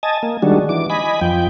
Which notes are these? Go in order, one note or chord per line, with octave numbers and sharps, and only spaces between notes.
D#5 G#5 A5
A#3
D#3 G3 G#3 D4 F#4
E3 D6
D#5 G#5 B5
F2 F3 G5